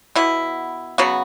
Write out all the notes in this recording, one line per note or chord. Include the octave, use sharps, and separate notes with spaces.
B2 B3 E4
C#3 F#3 B3 F#4